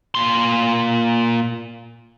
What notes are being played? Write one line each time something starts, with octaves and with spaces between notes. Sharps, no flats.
A#2 C6